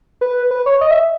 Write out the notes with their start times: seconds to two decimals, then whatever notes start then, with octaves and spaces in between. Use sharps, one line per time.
0.21 B4
0.51 B4
0.66 C#5
0.81 D#5
0.91 E5